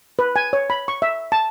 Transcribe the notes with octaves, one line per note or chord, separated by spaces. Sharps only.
B4
G#5
C#5
B5
C#6
E5
A5